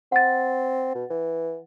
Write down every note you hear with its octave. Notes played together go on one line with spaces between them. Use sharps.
C4 F#5 A6
B2
E3